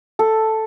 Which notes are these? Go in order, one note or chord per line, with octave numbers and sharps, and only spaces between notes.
A4